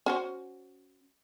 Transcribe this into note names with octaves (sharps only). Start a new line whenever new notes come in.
C#4 F#4 C5